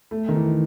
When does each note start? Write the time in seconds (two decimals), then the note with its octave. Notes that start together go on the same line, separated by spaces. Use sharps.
0.11 A3
0.29 D#3
0.35 E3